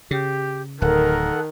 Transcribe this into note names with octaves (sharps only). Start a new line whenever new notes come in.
C#3 G4
D1 D#3 A4 A#4 F#5